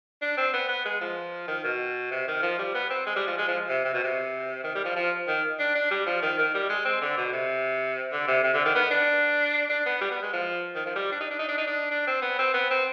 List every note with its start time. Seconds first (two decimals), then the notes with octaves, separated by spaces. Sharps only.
0.22 D4
0.37 C4
0.53 B3
0.69 B3
0.85 G#3
1.01 F3
1.48 D#3
1.64 B2
2.11 C3
2.28 D#3
2.42 F3
2.59 G3
2.74 B3
2.90 C4
3.06 G#3
3.16 G3
3.27 F3
3.38 G#3
3.48 F3
3.69 C3
3.85 C3
3.94 B2
4.04 C3
4.64 D#3
4.75 G3
4.85 F3
4.96 F3
5.27 D#3
5.59 D4
5.75 D4
5.91 G3
6.06 F3
6.22 D#3
6.38 D#3
6.54 G3
6.70 G#3
6.85 C4
7.01 D3
7.17 B2
7.33 C3
8.12 D3
8.28 C3
8.43 C3
8.54 D3
8.65 D#3
8.75 B3
8.91 D4
9.70 D4
9.86 B3
10.01 G3
10.11 B3
10.23 G#3
10.33 F3
10.75 D#3
10.86 F3
10.96 G3
11.12 D4
11.21 D#4
11.31 D4
11.39 D#4
11.49 D4
11.58 D#4
11.67 D4
11.91 D4
12.07 C4
12.22 B3
12.39 C4
12.54 B3
12.71 C4